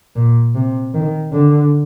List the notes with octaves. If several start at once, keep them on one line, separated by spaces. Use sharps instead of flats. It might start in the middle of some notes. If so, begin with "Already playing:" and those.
A#2
C3
D#3
D3